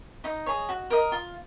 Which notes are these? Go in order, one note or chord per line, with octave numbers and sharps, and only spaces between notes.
D#4 D#5
G#4 C#5
F#4
A#4 D#5
F4